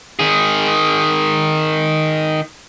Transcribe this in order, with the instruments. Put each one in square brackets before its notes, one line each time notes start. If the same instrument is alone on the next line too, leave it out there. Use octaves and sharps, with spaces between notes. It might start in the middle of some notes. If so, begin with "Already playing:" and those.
[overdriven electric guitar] D#3 G#4